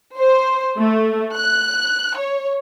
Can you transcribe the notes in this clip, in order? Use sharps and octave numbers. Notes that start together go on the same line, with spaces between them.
C5
A3
F#6
C#5